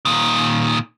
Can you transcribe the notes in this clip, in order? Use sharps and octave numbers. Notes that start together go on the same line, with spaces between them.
A#2 D#3